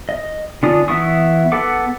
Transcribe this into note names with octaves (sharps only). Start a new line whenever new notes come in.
D#5
D3 C#4 D4 F4 D#6
E3 B3 E4 C#6 D#6
B3 A4 F#5 D6